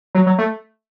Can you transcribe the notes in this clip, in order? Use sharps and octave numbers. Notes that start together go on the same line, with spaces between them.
F#3
F#3
A3